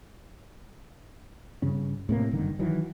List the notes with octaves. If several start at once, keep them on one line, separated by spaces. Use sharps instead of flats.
G2 C#3 C#4
A2 C3 A#3
F#1 G2 D3 D#3
D#3 E3 F#3